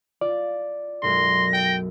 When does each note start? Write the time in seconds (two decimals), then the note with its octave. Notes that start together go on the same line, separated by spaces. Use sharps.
0.21 F4 D5
1.03 B1 F#2 G#3 C6 A#6
1.53 G5